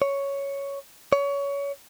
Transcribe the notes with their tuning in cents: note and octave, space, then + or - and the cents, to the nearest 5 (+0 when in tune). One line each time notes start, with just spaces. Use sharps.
C#5 +5
C#5 +25